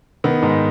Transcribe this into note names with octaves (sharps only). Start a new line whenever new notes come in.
D#3 B3
G#2